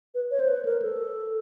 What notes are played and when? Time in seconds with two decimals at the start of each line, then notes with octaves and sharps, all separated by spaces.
0.15 B4
0.31 C#5
0.40 C5
0.48 B4
0.65 A#4
0.82 A4